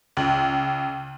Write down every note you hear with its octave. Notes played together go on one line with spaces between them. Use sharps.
C#2